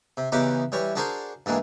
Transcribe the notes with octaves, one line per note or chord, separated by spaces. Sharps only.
C3
E2 C#3 E3 D#4 G4 D6
E3 G3 C#5
D4 F#4 G#4 A#4 C5
G2 E3 G#3 A#3